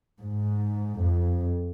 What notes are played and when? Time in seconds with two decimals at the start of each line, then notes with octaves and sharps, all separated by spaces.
0.20 G#2
1.02 F2